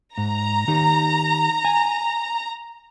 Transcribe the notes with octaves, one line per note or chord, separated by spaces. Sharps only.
G#2 A#5
D#3 D#4 G4
G#5